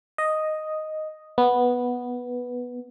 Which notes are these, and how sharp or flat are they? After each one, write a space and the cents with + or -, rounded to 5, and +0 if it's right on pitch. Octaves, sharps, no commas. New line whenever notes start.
D#5 +0
B3 -5